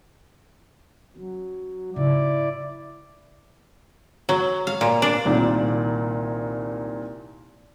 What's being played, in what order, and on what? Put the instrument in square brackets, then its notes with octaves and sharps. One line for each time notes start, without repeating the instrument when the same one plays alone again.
[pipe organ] F#3 [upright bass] C#4
[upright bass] G#2 C#3 [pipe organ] E4 D5
[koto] F#3
F5
A#2
D4
[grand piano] C2 A#2 D#3